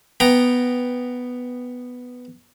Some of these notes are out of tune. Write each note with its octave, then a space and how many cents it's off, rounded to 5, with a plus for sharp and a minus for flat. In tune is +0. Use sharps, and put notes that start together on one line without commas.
B3 +0 G5 +0 A#5 +0